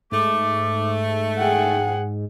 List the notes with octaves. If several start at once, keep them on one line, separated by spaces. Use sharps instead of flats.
G#2 A3 D6
G#4 F#5 G5